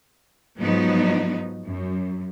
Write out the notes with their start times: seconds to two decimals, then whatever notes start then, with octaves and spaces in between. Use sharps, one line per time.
0.59 G#2 F3 F#3 B3 D#4
1.66 F#2